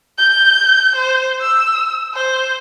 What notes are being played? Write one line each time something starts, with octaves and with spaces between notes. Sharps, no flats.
G6
C5
E6
C5